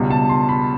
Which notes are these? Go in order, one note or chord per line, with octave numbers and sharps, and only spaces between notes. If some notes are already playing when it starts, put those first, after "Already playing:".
Already playing: C#2 B2 G3
A5
C6
B5